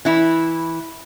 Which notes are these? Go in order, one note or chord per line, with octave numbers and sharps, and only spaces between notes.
E3 E4